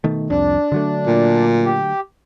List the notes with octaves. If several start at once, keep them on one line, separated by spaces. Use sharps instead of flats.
B2 D#3 A3
C2 F2 D4
D3 F#3 A3
A#2
G4